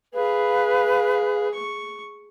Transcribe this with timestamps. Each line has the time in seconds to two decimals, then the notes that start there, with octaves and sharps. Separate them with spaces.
0.15 G#4 B4 F5
1.54 C#6